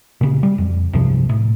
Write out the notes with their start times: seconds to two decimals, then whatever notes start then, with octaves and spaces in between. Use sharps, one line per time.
0.21 A#2 C#3
0.43 G3
0.58 F2
0.93 C2 G2 C3 F3
1.29 A2